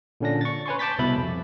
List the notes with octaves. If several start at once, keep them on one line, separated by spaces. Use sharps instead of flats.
A#2 D3 C#4 D4 A#6
C#6 A6
B4 C#5 G#5 C6 C#6
A5 D6 G6 A6 B6
C2 B2 E5 B5
F2